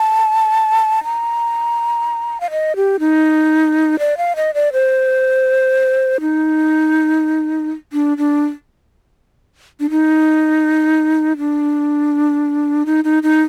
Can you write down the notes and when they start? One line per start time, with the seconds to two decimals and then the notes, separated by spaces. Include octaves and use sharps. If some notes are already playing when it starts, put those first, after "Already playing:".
Already playing: A5
1.04 A#5
2.40 F5
2.51 D#5
2.76 G4
3.00 D#4
3.99 D5
4.17 F5
4.36 D#5
4.54 D5
4.73 C5
6.21 D#4
7.93 D4
8.18 D4
9.80 D4
9.90 D#4
11.38 D4
12.86 D#4
13.04 D#4
13.23 D#4